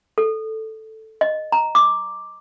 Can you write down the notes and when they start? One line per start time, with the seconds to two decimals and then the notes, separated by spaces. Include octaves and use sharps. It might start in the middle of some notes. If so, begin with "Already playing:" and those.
0.18 A4
1.21 D#5
1.52 A#5
1.75 D6